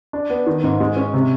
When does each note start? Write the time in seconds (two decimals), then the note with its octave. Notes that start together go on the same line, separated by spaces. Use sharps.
0.13 D4
0.30 B3
0.46 D#3
0.64 G#2
0.80 G#3
0.96 C#4
1.14 C3